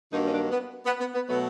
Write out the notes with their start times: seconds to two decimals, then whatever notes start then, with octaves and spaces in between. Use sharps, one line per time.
0.12 G2 D#3 F#3 A#3 D#4
0.26 C#4
0.32 D4
0.51 B3
0.86 B3
0.99 B3
1.14 B3
1.28 B2 F#3 A3 B3